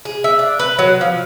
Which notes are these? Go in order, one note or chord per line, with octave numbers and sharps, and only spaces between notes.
G#4
E5
D4
B4
F#3
F3